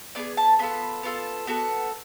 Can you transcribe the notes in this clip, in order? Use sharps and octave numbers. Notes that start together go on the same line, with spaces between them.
B3 D4 G#4 D5
A5
B3 F4 A4 B5
B3 F4 A4
B3 F#4 A4